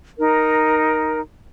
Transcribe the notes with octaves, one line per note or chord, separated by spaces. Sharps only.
D#4 A#4